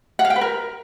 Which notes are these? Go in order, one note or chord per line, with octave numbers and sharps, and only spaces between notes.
F#5
F5
G5
B4
A#4